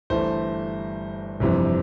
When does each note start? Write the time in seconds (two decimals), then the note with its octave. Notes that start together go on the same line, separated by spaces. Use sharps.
0.10 G1 G2 E3 A3 C5
1.40 G1 F2 C3 E3